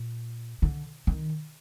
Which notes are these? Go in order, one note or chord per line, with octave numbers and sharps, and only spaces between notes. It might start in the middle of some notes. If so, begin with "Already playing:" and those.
Already playing: A#2
D3
D#3